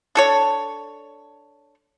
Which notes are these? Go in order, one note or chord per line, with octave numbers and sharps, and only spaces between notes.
D4 A4 C#5